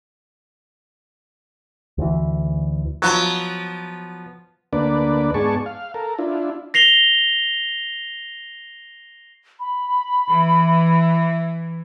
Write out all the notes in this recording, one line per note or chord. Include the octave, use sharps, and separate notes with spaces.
D2 E3
F3 F#3 B3
D2 A#3 D4 B4 D5
G#2 B3 G#4 D5 A5 C#6
F5
A4 A#4
D4 E4 F4
A#6 C7 F7 G7
B5
E3